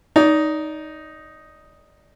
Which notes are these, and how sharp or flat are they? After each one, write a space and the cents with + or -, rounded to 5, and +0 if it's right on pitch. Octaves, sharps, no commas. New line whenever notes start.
D#4 +0 D5 -30